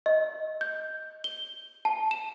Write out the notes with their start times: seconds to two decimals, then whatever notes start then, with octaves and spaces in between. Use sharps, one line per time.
0.06 D#5
0.61 G6
1.24 G7
1.85 A5
2.11 E7